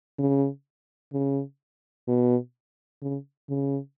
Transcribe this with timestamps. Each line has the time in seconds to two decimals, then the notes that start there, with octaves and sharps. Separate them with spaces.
0.19 C#3
1.13 C#3
2.08 B2
3.02 C#3
3.49 C#3